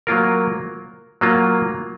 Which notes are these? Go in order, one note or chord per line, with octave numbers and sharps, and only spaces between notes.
F#3 A#3 F4 A#4
F#3 A#3 F4